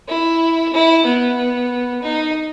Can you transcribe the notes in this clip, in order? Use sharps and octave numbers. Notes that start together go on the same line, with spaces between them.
E4
E4
B3
D#4